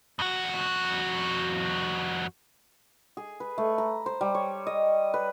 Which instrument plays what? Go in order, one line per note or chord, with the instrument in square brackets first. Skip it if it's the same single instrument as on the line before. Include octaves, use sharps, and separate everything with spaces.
[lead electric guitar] F2 F#4
[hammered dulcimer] G#4
B4
A3
A#5
C5
G3
C#5
D#5
B4